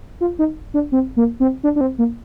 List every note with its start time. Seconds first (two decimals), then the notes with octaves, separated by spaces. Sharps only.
0.21 F4
0.39 D#4
0.74 D4
0.92 C4
1.17 A#3
1.40 C4
1.63 D4
1.76 D4
1.81 C4
1.99 A#3